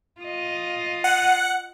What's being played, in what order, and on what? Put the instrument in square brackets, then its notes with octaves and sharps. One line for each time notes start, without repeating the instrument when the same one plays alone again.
[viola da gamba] F4 D#5
[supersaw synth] F#5